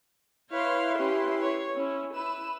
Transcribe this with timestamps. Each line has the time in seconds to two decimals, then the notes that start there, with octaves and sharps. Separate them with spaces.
0.50 E4 B4 C#5 F5 C6
0.98 C#4 G4
1.41 C#5
1.75 C#4 E4
2.13 E4 B4 E7